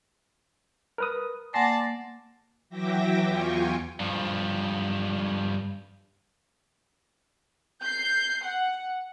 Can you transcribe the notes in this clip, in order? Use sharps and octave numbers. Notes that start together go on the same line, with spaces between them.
A#4 B4 D#6
A#3 D5 F#5 G#5 A5 C6 A#6 C7
E3 F#3 E5 G5 D6 A#6
E2 F4 G5 G#5 C#6
G2 F3
G6 C7
F#5